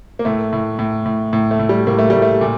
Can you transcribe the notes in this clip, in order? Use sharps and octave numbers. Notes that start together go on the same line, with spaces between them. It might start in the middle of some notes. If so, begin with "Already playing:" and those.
A#3
A2 A3
A2
A2
A2
A2
A3
A2
G3
A2 A#3
A3
A2 G3
A3
A#2